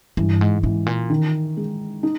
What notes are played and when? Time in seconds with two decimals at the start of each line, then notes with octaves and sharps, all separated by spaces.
0.17 G2 E3
0.41 G#2
0.63 G#2 E3
0.86 A#2
1.10 D#3
1.57 G#3
2.03 D#4